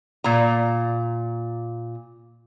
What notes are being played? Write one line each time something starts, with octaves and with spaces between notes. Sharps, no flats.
A#2 A#5